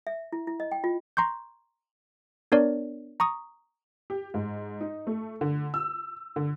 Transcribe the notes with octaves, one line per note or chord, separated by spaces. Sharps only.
E5
E4
E4
D#5
G5
F4
A#5 C6 C#6 G6
B3 D4 A#4 C#5 D5
A#5 C#6 D#6
G4
G#2
D#4
A3
D3
E6
D3